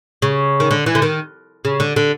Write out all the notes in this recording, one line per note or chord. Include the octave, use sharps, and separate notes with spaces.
C#3
D#3
D3
E3
D3
D#3
C#3
D3
D3